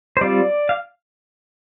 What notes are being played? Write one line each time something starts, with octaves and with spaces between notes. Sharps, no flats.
C5
G3 C4 F4 D5
F5